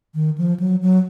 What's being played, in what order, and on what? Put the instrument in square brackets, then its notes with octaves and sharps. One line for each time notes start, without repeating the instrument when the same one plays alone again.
[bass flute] D#3
F3
F#3
F#3